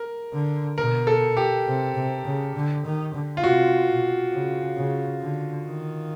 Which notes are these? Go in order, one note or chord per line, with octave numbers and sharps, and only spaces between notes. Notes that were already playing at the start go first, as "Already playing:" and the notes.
Already playing: A#4
D3
B2 A#4
A4
G4
C3
C3
C#3
D3
D#3
D3
F4
C3 F#4
B2
C#3
C#3
D3
D#3